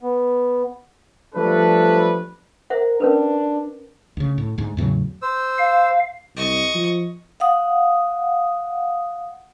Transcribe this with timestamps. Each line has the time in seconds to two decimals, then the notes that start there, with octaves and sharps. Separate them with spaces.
0.02 B3
1.35 F3 G3 A3 D4 A4 B4
2.70 A#4 C5 E5 F#5
3.00 C#4 D4 A#4 B4
4.17 D2 C#3
4.38 A2
4.58 D2 G#2
4.77 E2 A2 C#3 F#3
5.22 C5 E6
5.58 F5
6.36 C2 D#5 C#6
6.74 F3
7.40 F5 F#5 D#6